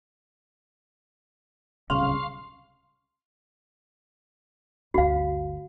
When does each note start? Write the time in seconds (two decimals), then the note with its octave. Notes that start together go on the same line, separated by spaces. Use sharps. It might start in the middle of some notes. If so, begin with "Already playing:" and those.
1.90 D1 C2 C#3 F5 C6 C#6
4.94 G1 D2 F#4 F5